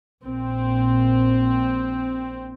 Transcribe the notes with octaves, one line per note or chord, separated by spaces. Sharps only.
A#1 C4